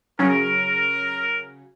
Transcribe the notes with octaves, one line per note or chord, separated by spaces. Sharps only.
C#3 F#3 C#4 A#4